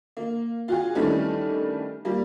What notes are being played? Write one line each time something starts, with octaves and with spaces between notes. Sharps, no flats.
A#3
F4 F#4 G#4
D#3 E3 G3 A3 C#4 D4
G3 A#3